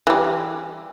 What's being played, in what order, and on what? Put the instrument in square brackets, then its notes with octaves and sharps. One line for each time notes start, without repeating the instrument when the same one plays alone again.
[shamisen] E3 G3